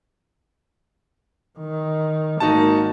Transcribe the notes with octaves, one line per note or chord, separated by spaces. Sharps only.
D#3
G#1 A#3 D#4 F#4 A5